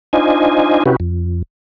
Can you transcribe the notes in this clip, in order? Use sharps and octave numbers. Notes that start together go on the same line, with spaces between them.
D4 D#4 F4 C5 D#5 G#5
C3 C#4 E4 F#4 G4 B4
F2